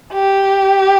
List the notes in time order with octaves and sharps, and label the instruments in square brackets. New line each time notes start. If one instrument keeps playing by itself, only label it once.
[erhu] G4